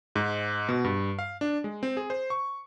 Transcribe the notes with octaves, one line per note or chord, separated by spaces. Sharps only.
G#2
B2
G2
F5
D4
G#3
C4
G#4
C5
C#6